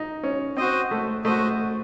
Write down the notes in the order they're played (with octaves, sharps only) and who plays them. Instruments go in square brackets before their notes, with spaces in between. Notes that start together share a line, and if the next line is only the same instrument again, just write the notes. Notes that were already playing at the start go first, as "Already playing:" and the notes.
Already playing: [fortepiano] D#4
C#4
[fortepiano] C4 [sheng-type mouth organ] F#4 C5 D#5
[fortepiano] A3
[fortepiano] A3 [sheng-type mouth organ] F#4 C5 D#5